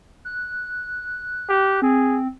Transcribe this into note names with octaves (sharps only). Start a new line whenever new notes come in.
F#6
G4
C4 G#4